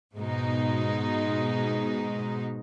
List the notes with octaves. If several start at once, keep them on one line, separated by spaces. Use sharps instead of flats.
G#2 B2 G#3 D#4